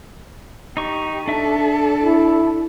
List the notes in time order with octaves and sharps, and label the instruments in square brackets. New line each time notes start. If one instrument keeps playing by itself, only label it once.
[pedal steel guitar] D#4 C#6 [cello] G4
[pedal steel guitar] D4 E5 [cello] A4 D5
[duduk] E4